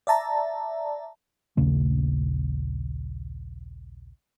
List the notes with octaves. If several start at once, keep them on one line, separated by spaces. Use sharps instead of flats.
D5 E5 A5 A#5
A#1 D#2 C#3 A3